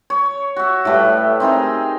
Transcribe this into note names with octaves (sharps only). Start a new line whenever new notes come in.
C#5
F#4 E5
A2 G3 A3 B4
C4 D#4 G#4 A#4